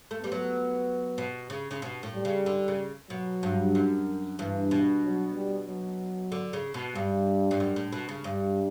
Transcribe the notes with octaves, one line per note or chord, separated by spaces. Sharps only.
A3
G3 B3
F#3
B2
C#3
C#3
B2
A2
G3
C#3
D3
C#3
B2 F#3
G2
F#2
G2 E3
B2
F#3
G3
F#3
D3
C#3
B2
G2 G3
G2
F#2
A2
B2
C#3
G2 G3